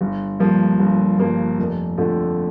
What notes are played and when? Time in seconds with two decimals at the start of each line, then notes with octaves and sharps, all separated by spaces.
0.01 G1
0.39 G2 F3 A#3
0.79 G1
1.19 G2 F3 A#3
1.58 F1
1.98 F2 D3 F3 A3